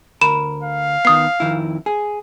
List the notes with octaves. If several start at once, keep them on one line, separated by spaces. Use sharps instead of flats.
D2 A#4 B5 E7
F5
D#3 B3 D#6 C7
F2 D#3 E4
G#4